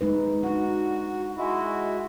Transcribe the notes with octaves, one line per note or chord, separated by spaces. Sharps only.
G#3 D#4 B4
D4 D#4 F#4
G#3 E4 F#4